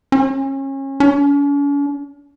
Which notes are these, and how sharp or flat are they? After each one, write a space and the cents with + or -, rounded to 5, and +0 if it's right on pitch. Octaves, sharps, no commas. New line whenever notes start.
C#4 -30
C#4 +45